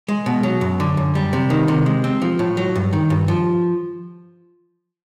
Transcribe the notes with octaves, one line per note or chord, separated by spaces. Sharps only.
G#3
B2
F#3
F#2
D3
F#2
G3
C3
D#3
C3
G#3
C4
F3
A2
F#3
G2
D#3
G2
F3